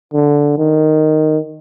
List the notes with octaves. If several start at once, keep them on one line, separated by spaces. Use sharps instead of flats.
D3
D#3